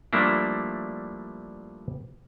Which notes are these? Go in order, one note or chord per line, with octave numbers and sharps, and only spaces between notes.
F3 G3 A3 A#3 D4 E4